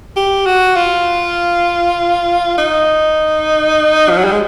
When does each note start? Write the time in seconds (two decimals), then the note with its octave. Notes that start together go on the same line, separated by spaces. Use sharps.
0.16 G4
0.46 F#4
0.76 F4
2.58 D#4
4.10 F3
4.17 F#3
4.24 G3
4.32 G#3